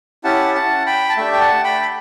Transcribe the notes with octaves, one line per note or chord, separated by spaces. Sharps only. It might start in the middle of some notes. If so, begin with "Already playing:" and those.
C#4 E4 G4 F#5 A5
F#5 A5
G5 B5
A5
A3 D4 G4 E5 G5
G5
F#5 A5
G5 B5
B5